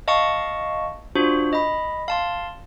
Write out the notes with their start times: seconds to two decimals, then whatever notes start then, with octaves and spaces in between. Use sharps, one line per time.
0.08 D#5 F5 A5 C#6 C#7
1.15 D4 F4 F#4 C5
1.53 D#5 B5
2.08 F5 A5 C6